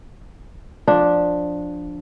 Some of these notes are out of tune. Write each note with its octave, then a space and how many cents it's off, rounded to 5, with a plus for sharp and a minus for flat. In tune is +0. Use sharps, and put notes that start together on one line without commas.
F3 +15 D4 +0